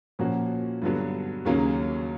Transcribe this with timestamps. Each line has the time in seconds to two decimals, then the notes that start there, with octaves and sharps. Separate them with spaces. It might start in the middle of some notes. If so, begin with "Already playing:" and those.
0.19 A#2 F3 A#3 C#4 F#4
0.82 G2 D3 F#3 B3
1.45 D#2 C#3 F#3 A#3 C#4